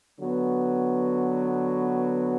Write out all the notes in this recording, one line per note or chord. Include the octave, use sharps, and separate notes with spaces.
D3 F#3 B3 F#4